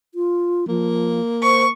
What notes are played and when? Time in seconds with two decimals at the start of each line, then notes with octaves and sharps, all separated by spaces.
0.15 F4
0.69 F3 A#3
1.43 C5 C#6